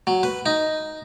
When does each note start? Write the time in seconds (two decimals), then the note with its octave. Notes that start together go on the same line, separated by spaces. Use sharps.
0.07 F#3
0.23 B4
0.46 D#4